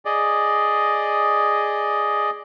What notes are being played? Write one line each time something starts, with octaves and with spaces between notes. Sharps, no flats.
G#4 D5 D#5